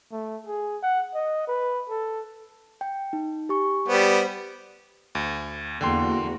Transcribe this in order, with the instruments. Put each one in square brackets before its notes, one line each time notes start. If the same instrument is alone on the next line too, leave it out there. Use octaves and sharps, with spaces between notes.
[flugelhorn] A3
G#4
F#5
D#5
B4
A4
[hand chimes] G5
D#4
G4 G#5 C#6
[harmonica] G3 B3 [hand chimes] C5
[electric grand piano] D2
[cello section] E2 A#3 F#4 [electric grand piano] D3 G5 C6